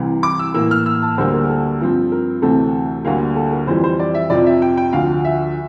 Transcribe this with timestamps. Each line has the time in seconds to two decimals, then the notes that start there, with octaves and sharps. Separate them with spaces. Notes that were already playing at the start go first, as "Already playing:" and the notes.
Already playing: C2 C3 E3
0.23 D6
0.39 E6
0.54 A2 E3 A#3 E6
0.71 F6
0.86 E6
1.02 A5
1.18 D2 D3 G3 A#3 C5
1.34 A#4
1.44 A#4
1.49 A4
1.81 G2 F3 C4
2.12 A#4
2.42 D2 C3 E3 A3 C4 A4
3.05 D2 D3 G3 A#3 F5
3.36 A4
3.52 A#4
3.67 F2 E3 G3 C5
3.84 C5
4.00 D5
4.14 E5
4.30 F2 C3 F3 C4 D5
4.46 E5
4.62 G5
4.77 G5
4.93 D2 D3 F3 F5
5.25 E5